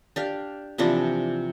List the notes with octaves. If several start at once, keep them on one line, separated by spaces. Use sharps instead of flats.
D4 G4 F5
C3 E3 F3 D4